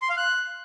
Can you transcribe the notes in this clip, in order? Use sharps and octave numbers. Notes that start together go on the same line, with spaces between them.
C6
F5
F#6